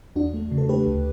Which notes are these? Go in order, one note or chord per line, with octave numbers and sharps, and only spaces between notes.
E2 D4 F#4
A3
C#3
A4
A3 G4 B4
D2